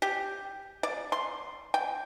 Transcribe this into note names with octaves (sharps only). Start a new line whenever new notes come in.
G4
D5
C6
G5